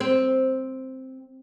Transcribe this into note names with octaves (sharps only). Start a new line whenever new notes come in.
C4